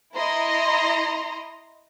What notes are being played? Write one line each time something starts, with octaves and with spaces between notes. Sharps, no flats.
E4 D#5 A#5 C6